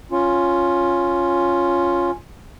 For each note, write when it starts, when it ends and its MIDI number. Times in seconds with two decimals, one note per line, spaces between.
0.12 2.11 61
0.12 2.11 65